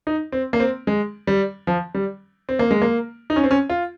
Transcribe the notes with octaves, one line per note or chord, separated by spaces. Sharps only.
D#4
C4
A#3
C4
G#3
G3
F3
G3
C4
A#3
G#3
A#3
D#4
C#4
C4
C#4
F4